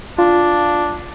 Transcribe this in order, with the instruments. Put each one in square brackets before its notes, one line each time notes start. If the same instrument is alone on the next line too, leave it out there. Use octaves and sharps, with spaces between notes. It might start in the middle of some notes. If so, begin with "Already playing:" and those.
[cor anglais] D4 [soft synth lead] F4